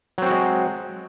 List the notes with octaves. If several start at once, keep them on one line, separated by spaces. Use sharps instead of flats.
F#3 G#3 C4 F#4